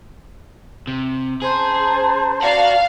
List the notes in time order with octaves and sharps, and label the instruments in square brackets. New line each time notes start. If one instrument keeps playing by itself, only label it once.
[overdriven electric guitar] C3
[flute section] C#4 A5 A#5 [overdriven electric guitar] G#4 [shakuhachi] C5
[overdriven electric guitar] F#4 F#5 [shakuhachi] D5 [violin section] F5